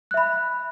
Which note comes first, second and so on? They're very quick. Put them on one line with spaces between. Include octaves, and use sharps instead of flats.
F#6 E5 B5